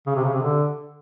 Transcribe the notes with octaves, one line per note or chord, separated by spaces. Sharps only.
C#3
C3
C#3
C3
D3